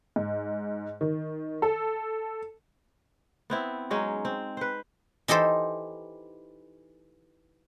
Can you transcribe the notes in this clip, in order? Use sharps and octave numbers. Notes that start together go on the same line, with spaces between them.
G#2
D#3
A4
B3 C4 E4
F#3 G#3 C#4 D#4
C4
B4 C5
E3 D#4 G4 A4 C5